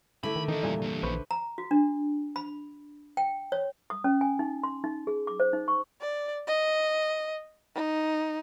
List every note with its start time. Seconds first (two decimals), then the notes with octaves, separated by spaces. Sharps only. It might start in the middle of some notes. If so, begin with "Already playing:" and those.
0.23 D3 A3 E4 B5
0.36 D#3
0.48 D#3 E3 D#4 A4
0.63 E2 A#2 G3 G#5
0.82 E3 A#3
1.03 A#1 B4 C5 C#6
1.31 A#5
1.58 F#4
1.71 D4
2.36 B5
3.17 G5
3.52 C#5
3.90 D#6
4.04 C#4
4.21 G#5
4.39 D#4
4.63 C6
4.84 D#4
5.07 G#4
5.27 D6
5.40 C5
5.53 D#4
5.68 C#6
6.01 D5
6.47 D#5
7.75 D#4